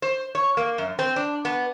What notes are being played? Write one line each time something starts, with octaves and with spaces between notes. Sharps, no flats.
C5
C#5
A#3
F#2
C4
D4
B3